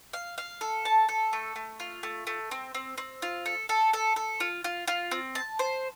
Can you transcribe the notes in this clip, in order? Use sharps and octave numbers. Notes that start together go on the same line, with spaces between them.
F5
F5
A4
A5
A4
A3
A3
F4
A3
A3
C4
C4
C4
F4
A4
A4
A4
A4
F4
F4
F4
C4
A5
C5